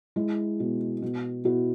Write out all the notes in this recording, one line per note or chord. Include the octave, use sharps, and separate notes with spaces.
G#3 E4
B2
B2
B2 E4 F#4